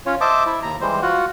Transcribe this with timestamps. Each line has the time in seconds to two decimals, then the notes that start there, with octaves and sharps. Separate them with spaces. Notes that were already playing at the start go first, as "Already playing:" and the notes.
0.06 C#4 F4 C#5
0.21 C5 D#5 E5 A5 D6
0.46 E4 E5
0.63 D#2 A#5
0.81 E3 G3 G#3 C5
1.02 F4 F#4 F#5